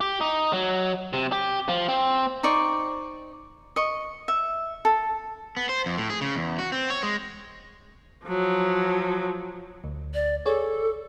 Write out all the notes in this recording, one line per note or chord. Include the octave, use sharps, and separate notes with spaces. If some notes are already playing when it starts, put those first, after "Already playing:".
G4
D#4
F#3
C3
G4
F3
C4
D#4 C5 D5 C#6
D#5 C#6
E5
A4
B3
C5
F2
A2
G#4
C#3
E2
F#4
C4
C#5
G#3
F3 F#3
D2
D5
G#4 A4 C#5 D5